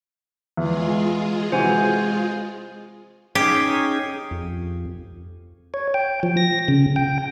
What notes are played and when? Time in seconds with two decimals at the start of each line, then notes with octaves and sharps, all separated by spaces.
0.57 E2 G#3 F4 G#4
1.52 C3 E3 F#4 C5 G#5
3.35 C#4 D#4 G4 G#4
4.31 F2
5.74 C#5
5.94 G5
6.23 F3
6.37 A#6
6.68 C#3
6.96 G5